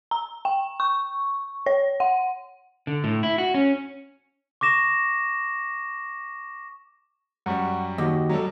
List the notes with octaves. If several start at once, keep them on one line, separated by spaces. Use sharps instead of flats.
A#5
G5
C#6
C#5
F#5
D3
A2
E4
F#4
C#4
C#6 D6 A#6 E7
F#2 G3 F#5 C#6
D#2 F#4 G4 D#5
F#3 G3 A4